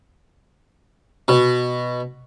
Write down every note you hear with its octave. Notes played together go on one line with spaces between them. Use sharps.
B2